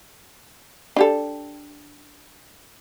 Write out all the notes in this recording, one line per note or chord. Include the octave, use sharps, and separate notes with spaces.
D4 G4 A4